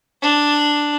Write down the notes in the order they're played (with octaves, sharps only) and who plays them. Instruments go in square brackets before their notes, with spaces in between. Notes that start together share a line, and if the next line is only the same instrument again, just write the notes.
[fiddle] D4